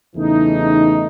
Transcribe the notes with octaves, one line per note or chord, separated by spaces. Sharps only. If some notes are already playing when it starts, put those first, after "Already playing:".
E2 C#3 E3 A3 D#4